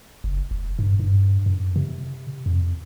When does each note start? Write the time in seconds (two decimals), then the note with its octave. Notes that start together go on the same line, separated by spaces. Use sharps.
0.24 F#1
0.51 F1
0.79 G2
0.99 G2
1.46 F#2
1.76 C3
2.46 F2